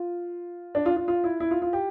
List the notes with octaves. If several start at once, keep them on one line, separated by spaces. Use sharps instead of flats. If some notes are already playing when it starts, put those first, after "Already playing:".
Already playing: F4
D4
F4
F4
F4
E4
E4
F4
F4
G4